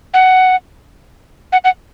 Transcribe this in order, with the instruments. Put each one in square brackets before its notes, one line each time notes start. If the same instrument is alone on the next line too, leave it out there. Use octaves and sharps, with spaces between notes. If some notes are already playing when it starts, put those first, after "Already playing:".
[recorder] F#5
F#5
F#5